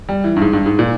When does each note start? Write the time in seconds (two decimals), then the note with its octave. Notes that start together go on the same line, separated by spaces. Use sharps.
0.09 G3
0.24 E3
0.36 G2
0.42 G#2
0.53 G2
0.66 G#2
0.79 A#2